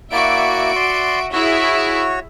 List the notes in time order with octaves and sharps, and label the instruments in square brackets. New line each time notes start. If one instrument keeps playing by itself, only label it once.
[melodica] A#3 E4 D5 [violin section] F#4 E5 D7
[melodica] D5 C6
[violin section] E4 G#4 E5 [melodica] F#4 C#5